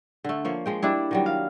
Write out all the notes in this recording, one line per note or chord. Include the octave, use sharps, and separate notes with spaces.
D3 A3
F3 A#3 C#5
F3 G#3 G5
G3 D4 E4
D#3 F#3 G3
F5